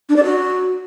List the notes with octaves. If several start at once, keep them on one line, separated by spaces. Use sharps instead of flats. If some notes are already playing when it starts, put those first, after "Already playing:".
D4
D5
F#4